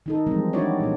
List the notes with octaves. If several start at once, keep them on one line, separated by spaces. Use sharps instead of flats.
D#3 D#4 A4
E3 F3 G3 G#3 C4
D4 E4 F#4 G4 C#5 D5
A#2 B3